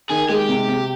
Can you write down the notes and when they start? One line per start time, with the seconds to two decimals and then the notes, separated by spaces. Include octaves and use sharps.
0.10 D#3 G#4
0.29 G#3 G4
0.49 C3
0.68 C3